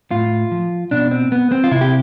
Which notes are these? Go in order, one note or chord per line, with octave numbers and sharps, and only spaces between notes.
A2 F4
F3
B2 D4
C4
B3
C4
F4
C3 E4
G4